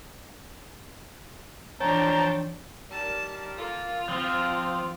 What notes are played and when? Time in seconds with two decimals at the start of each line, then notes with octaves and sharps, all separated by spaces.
1.81 E3 F3 D4 C#5 G5 A5 A#5
2.90 D#3 G3 A#4 A5
3.58 A#3 F4 A4
4.09 F3 C4